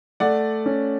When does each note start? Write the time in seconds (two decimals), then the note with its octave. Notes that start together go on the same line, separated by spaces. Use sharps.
0.20 A3 D5 F#5
0.66 C#4